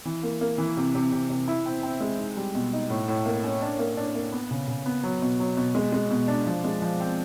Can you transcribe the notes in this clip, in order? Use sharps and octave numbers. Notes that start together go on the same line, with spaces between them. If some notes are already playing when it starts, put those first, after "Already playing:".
E3
A#3
A#3
E3
C3
C3
C3
C3
E4
C4
C4
G#3
D#4
G3
B2
D#4
A2
A2
A#3
C#4
D4
A#3
D4
A#3
B3
C#3
C#3
B3
F#3
B2
F#3
B2
G#3
G#3
B2
D4
F3
G#3
F3
C4